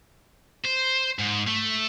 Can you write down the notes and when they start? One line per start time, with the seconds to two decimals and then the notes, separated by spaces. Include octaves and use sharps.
0.65 C5
1.19 G#2
1.47 A3